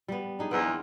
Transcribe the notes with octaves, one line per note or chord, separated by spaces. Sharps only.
G3 B3
D4 D#4 G#4
E2 B3 C4 A#4